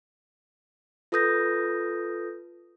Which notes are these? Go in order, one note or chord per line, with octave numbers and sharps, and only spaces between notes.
F4 A4 B4 D#6 G6 A#6